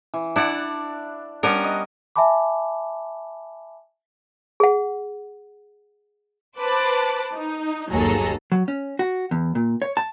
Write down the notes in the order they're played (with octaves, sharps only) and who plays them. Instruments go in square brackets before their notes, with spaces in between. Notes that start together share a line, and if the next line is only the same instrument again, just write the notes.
[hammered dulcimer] E3
[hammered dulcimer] D4 [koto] E4 D5 F#5
[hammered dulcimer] G3 D4 [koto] B3 C#4 A#4
[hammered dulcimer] D#5
[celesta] E5 G#5 A5 B5 D6
[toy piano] G#4 F#5
[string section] B4 C5 A5 D6 F#6
D#4
G1 D#2 F#3 G#4 A4 A#5
[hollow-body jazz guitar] F#3
C#4
F#4
E2
A#2
C#5
A5